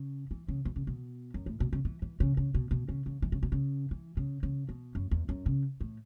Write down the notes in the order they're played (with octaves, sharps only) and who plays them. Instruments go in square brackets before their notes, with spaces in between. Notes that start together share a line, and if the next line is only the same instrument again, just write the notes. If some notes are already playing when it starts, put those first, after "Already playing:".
Already playing: [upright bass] C#3
E3
C#3
B2
C#3
B2
F#2
A2
B2
C#3
E3
E3
C#3
C#3
B2
B2
C#3
C#3
E3
C#3
B2
C#3
E3
C#3
C#3
B2
F#2
E2
F#2
C#3
A2